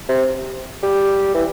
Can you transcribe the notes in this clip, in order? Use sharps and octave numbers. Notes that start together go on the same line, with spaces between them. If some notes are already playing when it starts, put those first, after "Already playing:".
C3
G3
E3